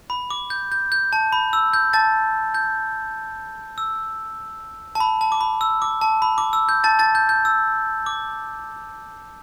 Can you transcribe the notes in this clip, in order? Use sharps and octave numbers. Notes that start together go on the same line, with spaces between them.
B5
D6
G6
G6
G6
A5
B5
E6
G6
A5 A6
G6
E6
A5
B5
A5
D6
B5
E6
D6
A5
B5
D6
E6
G6
A5 A6
A5 A6
G6
G6
E6
D6